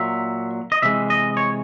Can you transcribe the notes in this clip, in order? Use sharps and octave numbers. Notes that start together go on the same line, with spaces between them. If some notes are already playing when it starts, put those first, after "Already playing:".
Already playing: A#2 F#3 E5
D#5
C3 E3 G#3 E5
D#5
C#5